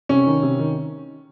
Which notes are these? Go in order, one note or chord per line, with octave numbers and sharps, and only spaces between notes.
C3 C#4
D#3
C3
D#3